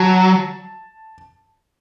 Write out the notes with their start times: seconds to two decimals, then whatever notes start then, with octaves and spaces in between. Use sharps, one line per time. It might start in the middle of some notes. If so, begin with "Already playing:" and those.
Already playing: F#3 A5